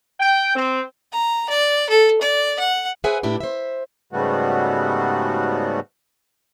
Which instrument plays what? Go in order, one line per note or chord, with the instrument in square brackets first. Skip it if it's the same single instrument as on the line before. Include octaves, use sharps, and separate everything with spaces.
[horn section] G5
C4
[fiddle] A#5
D5
A4
D5
F#5
[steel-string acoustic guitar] G#4 B4 C5 E5 F#5 G#5
A2 D4 E4 G4
C5 E5
[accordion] G#2 C#3 G3 A3 B3 F#4